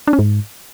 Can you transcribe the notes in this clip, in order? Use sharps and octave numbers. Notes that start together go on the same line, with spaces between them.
D4
C#4
G#2